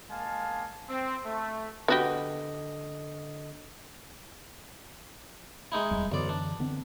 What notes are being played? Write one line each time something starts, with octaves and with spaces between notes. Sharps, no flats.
G#3 A#3 F5 G#5 A5
C4
A3
D3 B3 F#4 G4 D#5
G#3 D#4 E4
D1 E2 G3
B1 F#2 D3 E3 D5
D4
D3 B3 C4